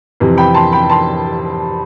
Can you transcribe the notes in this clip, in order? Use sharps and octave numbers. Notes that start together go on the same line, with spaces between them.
F2 C3 E3
G5 B5
A5 C6
G5 B5
A5 C6